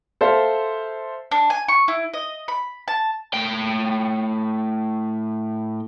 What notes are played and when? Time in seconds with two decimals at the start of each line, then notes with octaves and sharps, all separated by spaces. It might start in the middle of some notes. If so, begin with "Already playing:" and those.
0.21 A4 C5 E5 F5
1.31 D4
1.50 G#5
1.68 C#6
1.88 E4
2.13 D#5
2.48 B5
2.88 A5
3.34 A2 G5